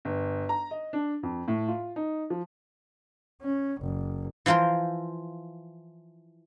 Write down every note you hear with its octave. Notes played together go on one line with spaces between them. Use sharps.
G1
A#5
D#5
D4
F2
A2
F4
D#4
F3
C#4
F#1
E3 F3 F4 A#4 C5